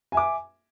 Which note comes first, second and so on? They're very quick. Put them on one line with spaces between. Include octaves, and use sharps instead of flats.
G#5 E5 D6